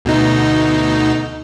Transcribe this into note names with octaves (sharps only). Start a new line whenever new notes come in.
D2 B2 D#4